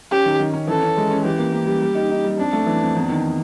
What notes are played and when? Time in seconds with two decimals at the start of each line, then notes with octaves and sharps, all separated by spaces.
0.11 C#4 G4
0.25 D#3
0.40 D#3
0.54 C#4
0.67 E3 A4
0.82 C#4
0.97 G#3
1.11 C#4
1.25 E3 G4
1.38 A#3
1.52 A#3
1.67 G3
1.82 G3
1.95 D#4
2.10 D#4
2.24 G3
2.38 F2 D4
2.53 A3
2.67 E3
2.81 F2
2.96 E2
3.09 D#3